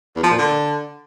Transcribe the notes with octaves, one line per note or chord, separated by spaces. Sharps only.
E2
F3
A#2
D3